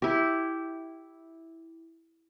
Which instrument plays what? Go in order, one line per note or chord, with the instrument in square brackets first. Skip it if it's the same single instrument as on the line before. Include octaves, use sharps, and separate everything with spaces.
[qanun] E4 G4